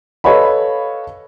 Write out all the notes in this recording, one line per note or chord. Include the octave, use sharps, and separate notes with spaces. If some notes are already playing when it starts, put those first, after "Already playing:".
A4 B4 C#5 D#5 F5 B5